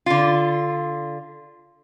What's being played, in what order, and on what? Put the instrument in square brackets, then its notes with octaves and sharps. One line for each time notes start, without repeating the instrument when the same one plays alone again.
[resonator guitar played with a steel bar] D3 F4